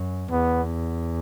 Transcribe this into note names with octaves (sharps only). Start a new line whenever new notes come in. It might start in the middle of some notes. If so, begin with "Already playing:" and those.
Already playing: F#2
E2 B3